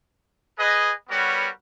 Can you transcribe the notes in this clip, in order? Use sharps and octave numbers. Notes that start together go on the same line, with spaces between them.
G#4 B4 D#5
G3 B3 F#4 A#4 B4 C#5